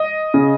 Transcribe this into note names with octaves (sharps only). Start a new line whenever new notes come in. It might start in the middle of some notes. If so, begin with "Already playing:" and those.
Already playing: D#5
C#3